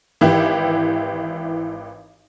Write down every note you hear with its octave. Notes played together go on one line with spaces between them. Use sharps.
G#1 E3 E4 G4